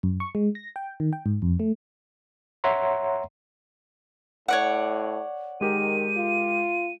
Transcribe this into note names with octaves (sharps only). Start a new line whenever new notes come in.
F#2
C#6
G#3
A#6
G5
D#3
G5
G#2
F2
A3
C#5 E5 F#5 A#5 C6
A2 C#5 D5 F#5
D#3 G#3 G4 A#4 D#7
F4